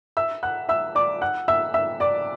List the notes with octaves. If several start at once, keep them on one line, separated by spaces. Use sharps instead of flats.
E5 E6
F#5 F#6
E5 E6
D5 D6
F#5 F#6
E5 E6
E5 E6
D5 D6